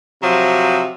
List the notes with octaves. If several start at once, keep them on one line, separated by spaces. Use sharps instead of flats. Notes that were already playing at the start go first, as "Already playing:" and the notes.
C3 F3 F#3